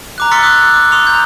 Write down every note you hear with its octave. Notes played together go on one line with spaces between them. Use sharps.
A#5 D6 F#6
C6 E6 F6 A6 B6 C#7
C6 D6 D#6 F#6
D6
C6 D#6 F7
A#5 G6